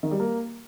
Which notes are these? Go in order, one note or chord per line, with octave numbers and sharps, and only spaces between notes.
D#3
G3
A#3